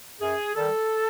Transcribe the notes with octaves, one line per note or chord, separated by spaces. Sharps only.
F#2 G#4
D#3 G3 A4